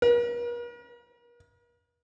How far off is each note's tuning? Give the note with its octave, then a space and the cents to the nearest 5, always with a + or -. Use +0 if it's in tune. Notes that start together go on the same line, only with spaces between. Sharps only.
A#4 +45